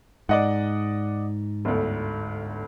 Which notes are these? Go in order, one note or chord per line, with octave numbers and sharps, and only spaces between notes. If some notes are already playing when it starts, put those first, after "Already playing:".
G#2 D5 D#5 F#5
G1 D2